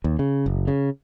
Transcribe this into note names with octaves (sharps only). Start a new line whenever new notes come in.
D#2
C#3
F#1
C#3